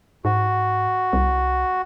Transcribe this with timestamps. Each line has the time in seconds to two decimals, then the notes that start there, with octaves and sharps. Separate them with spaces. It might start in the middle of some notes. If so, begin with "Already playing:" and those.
0.25 G#2 F#4
1.13 C2